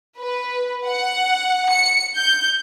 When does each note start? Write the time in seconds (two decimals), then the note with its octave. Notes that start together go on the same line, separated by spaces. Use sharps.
0.20 B4
0.87 F#5
1.71 C#7
2.16 G6